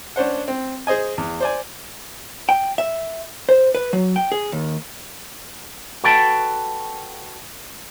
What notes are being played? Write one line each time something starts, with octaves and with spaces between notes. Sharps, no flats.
C#4 D4 C5 F#5
C4
G#4 C5 D#5 G#5
E2
C5 D5 G#5
G5
E5
C5
B4
F#3
G5
G#4
D#2
F#4 A4 B4 G5 A5